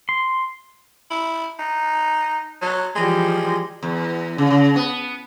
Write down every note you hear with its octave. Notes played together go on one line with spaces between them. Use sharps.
C6
E4
D#4
F#3
E3 F3 G3 G#3
E2
C#3
C#3
B3